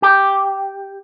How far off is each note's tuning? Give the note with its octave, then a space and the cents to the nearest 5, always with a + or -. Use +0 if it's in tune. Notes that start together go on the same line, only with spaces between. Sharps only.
G4 +0